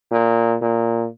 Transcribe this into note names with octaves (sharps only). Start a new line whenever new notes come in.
A#2
A#2